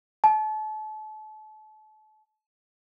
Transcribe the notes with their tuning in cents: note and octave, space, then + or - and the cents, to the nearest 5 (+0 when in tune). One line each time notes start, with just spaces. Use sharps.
A5 -35